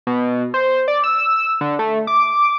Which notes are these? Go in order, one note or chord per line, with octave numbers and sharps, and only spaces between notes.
B2
C5
D5
E6
E6
D3
A3
D6